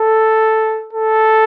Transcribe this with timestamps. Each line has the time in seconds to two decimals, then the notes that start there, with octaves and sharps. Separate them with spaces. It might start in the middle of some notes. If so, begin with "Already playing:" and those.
Already playing: A4
0.93 A4